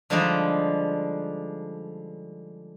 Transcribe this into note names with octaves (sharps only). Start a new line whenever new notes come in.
D3 F3 G3 G#3 D4 D#4